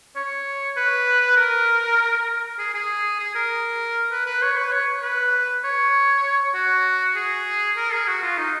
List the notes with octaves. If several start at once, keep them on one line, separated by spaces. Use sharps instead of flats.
C#5
B4
A#4
G#4
G#4
G#4
A#4
B4
B4
C#5
B4
C#5
B4
C#5
F#4
G#4
A#4
G#4
F#4
F4
D#4